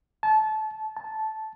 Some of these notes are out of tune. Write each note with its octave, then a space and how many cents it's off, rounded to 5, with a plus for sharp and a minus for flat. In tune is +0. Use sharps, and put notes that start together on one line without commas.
A5 -25
A5 -10